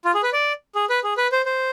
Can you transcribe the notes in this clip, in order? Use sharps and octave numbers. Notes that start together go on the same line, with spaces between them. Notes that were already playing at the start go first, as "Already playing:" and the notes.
F4
G#4
B4
D5
G#4
B4
G#4
B4
C5
C5